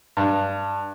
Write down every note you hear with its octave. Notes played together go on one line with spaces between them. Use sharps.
G2